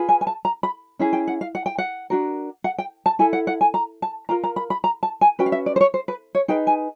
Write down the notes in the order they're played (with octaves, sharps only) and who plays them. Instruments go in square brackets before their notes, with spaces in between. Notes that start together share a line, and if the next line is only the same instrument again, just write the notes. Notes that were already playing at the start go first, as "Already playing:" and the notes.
Already playing: [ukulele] F4 G#4 B4
G#5
G#5
A5
A#5
B5
C#4 E4 G#4
G5
F#5
F5
F#5
G5
F#5
D4 F#4 A#4
F#5
G5
A5
E4 A4 G#5
F#5
F#5
G#5
A#5
A5
F4 A#4 A#5
A#5
B5
B5
A#5
A5
G#5
C#4 F#4 B4 G5
F5
E5
D5
C5
C#5
C5
B4
C#5
D#4 G#4 B4 G5
G#5